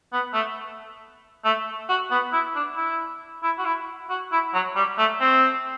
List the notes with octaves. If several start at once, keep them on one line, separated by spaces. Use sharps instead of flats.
B3
A3
A3
F#4
B3
E4
D4
E4
E4
F#4
E4
F#4
E4
F#3
G3
A3
C4